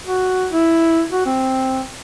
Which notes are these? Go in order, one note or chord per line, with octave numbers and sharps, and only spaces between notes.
F#4
E4
F#4
C4